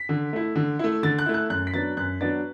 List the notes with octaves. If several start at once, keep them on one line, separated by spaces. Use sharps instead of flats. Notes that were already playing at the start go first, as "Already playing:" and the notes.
Already playing: B6
D3
A3 E4
D3
A3 E4
D3 A6
F#6
A3 E4
F#6
F#2 F#6
B6
F#3 B3 D4 A6
F#2 F#6
F#3 B3 D4 A6